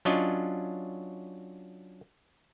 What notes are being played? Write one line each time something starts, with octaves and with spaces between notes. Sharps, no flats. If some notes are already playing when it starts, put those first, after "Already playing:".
F#3 C#4 D4 F4 D#5